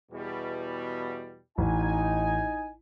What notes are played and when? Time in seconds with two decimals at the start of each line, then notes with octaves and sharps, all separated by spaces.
0.11 E2 B2 G3
1.58 A1 D#4 G#5